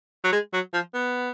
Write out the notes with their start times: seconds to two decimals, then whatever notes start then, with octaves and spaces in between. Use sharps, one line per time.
0.24 F#3
0.32 G#3
0.53 F#3
0.73 F3
0.94 B3